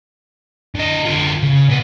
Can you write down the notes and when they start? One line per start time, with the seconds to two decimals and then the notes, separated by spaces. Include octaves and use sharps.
0.75 D3 D#5
1.05 D3 F4
1.43 C#3
1.69 A#2 B3